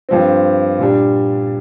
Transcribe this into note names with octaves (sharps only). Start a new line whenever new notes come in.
G2 F3 C4
A#2 G3 D4